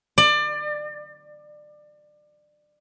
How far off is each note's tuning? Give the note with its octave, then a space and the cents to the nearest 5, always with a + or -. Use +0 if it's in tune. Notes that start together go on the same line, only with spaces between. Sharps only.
D5 +25